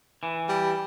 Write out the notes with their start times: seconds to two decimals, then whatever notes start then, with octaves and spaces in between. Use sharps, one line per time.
0.23 E3
0.49 G3